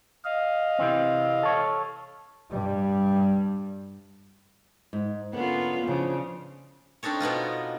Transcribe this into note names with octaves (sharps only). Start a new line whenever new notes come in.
D#5 F5
C3 E3 C4
A4 C#5
G2 G3
G#2
D3 A#3 B3 C#4 F4 F#5
C#3 E3 F3 D4
C4 D4 D#4 A4 C#5
B2 B3 D#4 F4